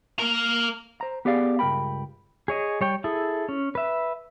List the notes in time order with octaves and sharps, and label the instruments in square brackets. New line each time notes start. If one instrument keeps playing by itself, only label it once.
[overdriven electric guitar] A#3 A#4
[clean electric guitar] C5 A#5
B3 G4 G#4 D5 F5
C#2 G2 A#3 A#4 G5 B5
[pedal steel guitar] G#4 C#5 D#5
G3 C#5 G5
E4 G#4 A4
C#4
B4 E5